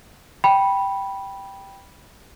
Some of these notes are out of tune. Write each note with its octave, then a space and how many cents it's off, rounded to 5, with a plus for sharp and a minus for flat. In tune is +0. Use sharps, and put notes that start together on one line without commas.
G5 +0 B5 -10